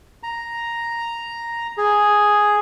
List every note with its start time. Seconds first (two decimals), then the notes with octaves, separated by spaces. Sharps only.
0.23 A#5
1.78 G#4